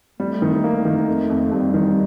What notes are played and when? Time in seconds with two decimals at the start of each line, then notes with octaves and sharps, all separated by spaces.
0.20 G3 A3
0.42 D#3
0.64 A#3
0.85 D#3
1.08 F2
1.30 F2
1.51 F2 G3
1.74 D#3